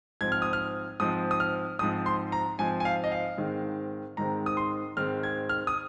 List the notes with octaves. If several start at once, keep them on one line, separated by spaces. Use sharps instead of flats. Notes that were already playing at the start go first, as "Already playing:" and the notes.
G#2 F3 C4 G#6
F6
D#6
F6
G#2 F3 C4 D#6
D#6
F6
G#2 F3 C4 D#6
C6
A#5
G#2 F3 C4 G#5
G#5
F5
D#5
F5
G#2 D#3 G#3 C4
G#2 D#3 G#3 C4 A#5
D#6
C6
G#2 D#3 G#3 C4 F6
G#6
F6
D#6